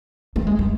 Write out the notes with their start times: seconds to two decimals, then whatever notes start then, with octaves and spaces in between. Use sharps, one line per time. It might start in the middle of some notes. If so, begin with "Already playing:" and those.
0.36 A3
0.47 G#3
0.59 A3